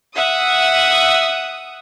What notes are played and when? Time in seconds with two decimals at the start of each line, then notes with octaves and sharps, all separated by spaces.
0.17 E5 F#5 D#6